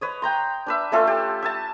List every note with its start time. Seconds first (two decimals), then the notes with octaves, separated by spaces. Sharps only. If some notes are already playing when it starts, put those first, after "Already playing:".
0.01 B4 C#5 D#5
0.22 G5 A#5 C6
0.67 D4 B4 E5
0.92 A3 C#4 F4 A4
1.07 G4
1.42 E5 G#5 A5